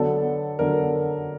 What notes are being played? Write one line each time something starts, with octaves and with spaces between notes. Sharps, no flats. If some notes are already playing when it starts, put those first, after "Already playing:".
Already playing: D3 F#3 B3 D4 A4
D3 F#3 B3 D4 A#4